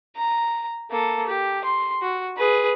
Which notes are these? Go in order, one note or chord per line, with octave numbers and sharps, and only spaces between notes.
A#5
A#3 A4
G4
C6
F#4
G#4 B4